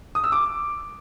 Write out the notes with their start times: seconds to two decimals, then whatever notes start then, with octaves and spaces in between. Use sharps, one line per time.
0.15 D#6
0.24 E6
0.32 D6